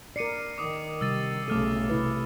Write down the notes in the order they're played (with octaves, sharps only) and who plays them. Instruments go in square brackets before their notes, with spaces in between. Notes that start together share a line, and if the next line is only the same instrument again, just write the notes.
[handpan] A#4 D5 [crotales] C7 C#7 D#7
[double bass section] D#3 [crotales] D6 D#6
[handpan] C3 G3 [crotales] E6 A6 D#7
[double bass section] B1 C#3 [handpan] A3 A4 [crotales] D6 F6 D#7
[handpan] C3 E4 B4